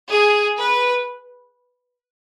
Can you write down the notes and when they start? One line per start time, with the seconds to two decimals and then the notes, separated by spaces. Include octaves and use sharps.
0.10 G#4
0.57 B4